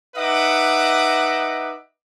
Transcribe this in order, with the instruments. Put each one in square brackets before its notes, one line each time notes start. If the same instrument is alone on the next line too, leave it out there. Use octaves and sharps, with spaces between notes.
[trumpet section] D#4 B4 D#5 E5 F#5 D6